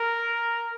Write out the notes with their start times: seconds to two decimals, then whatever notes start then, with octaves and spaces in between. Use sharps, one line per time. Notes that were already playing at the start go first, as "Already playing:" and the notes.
Already playing: A#4